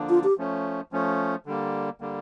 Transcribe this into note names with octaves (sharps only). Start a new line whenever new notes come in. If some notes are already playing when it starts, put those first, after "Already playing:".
Already playing: D3 F3 A#3 D4
F4
G4
F3 A3 C#4
F3 A3 C#4
D3 G3 A#3
D3 G3 A#3